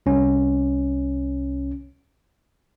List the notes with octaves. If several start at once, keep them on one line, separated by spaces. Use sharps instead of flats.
C2 C#4